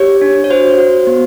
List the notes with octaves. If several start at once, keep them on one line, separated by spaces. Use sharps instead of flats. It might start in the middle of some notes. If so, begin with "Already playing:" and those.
Already playing: G4 C#5
D4
C#5
F#4 C5
F#4
B3